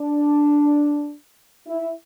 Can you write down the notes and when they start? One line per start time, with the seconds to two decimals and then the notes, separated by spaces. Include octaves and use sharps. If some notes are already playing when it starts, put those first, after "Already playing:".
Already playing: D4
1.67 E4